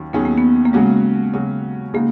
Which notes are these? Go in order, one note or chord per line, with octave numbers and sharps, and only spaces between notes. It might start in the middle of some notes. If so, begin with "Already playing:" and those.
Already playing: D#2 D#3 F#3 C#4
D#2 D#3 F#3 B3 C#4 G#4
A#3
B3
A#3
C#3 F#3 G#3 C#4 F#4
C#3 F#3 C#4 F#4
C#3 G#3 A#3 D#4 F#4